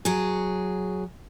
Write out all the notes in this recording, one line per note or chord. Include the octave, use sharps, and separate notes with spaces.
F#3 G#4